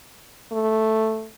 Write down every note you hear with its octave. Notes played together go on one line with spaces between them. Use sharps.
A3